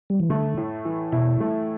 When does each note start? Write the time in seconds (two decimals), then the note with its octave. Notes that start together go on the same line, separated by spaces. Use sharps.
0.10 G3
0.20 E3
0.30 D3 A3
0.57 A2
0.85 E3
1.12 B2 E4
1.40 A3